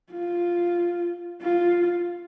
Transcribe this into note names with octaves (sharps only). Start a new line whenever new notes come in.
F4
F4